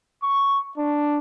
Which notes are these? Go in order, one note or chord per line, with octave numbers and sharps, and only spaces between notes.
C#6
D4